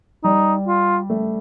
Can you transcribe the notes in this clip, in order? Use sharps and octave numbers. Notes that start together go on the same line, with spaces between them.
G3 D#4
F4
A3